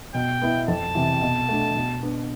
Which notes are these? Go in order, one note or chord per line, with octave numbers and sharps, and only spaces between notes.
B2 G5
B3 E4
F2 A5
C3 E3
B2
A3 D4
B2
B3 D4